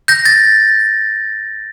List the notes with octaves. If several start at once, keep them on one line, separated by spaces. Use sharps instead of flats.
G6 A#6
A6